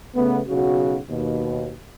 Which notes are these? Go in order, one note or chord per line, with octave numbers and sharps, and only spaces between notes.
C#3 A3 B3
B1 C#3 F#4
D#2 B2